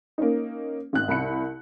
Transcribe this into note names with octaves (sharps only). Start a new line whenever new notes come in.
A#3 C#4 D#4
G#1 F#6
C2 E4 B5 C#7